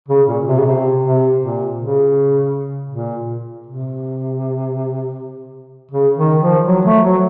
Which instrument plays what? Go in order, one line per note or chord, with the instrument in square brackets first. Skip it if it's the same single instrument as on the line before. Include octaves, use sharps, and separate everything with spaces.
[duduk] C#3
A#2
C3
C#3
C3
C3
A#2
C#3
A#2
C3
C#3
D#3
F3
F#3
A3
F#3